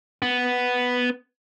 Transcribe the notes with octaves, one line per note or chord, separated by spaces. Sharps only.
B3